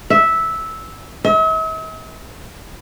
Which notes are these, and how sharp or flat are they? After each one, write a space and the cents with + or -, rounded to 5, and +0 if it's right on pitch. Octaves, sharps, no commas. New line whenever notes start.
E5 -10
E5 -45